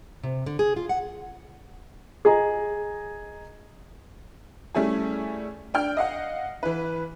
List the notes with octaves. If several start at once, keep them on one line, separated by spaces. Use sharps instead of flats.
C3
D3
G#4
F4
F#5
G#4 D#5 G#5 A#5
G3 A3 C#4 E4 G#4
D4 G5 F6
D#5 F5 F#5
E3 B4